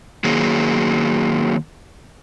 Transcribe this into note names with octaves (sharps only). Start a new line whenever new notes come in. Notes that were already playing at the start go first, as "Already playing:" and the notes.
D#3 F#3 A#3 G#4